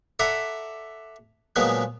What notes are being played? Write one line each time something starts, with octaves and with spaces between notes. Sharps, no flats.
A4 D5 E5 F#5 A#5 B5
A#2 C#3 F3 F#3 G#3 B3